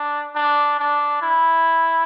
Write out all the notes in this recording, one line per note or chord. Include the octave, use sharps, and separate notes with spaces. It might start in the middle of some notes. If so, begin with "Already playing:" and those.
Already playing: D4
D4
D4
E4